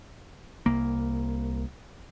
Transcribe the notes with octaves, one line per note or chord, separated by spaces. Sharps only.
C2 A#3